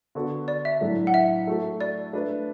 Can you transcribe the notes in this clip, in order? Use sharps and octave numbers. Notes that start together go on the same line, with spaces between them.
D3 B3 F#4 A4
D5
E5
A2 F#3 D4 A4
F#5
E5
A3 F#4 A4
D5
A3 D4 B4